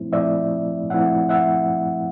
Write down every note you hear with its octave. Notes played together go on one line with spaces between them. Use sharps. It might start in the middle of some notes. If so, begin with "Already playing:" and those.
Already playing: A#2 F3 A3 C4 E4
A#2 F3 A3 C4 E4 D5 E5
A#2 F3 A3 C4 E4 E5 F#5
E5 F#5